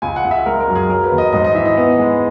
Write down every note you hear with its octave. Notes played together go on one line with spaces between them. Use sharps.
C#2 G#5
F#5
C#2
E5
G#3 A#4
A#4
F#2
G#4
F#3 A#4
B4
D#2
D#5
G#2 D#5
D#5
E3 E5
D#5
B3
G#3